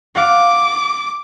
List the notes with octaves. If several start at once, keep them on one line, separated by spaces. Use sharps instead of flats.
F5 F#5 D6